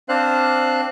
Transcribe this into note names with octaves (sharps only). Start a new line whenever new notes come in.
C4 D4 C5 F5 F#6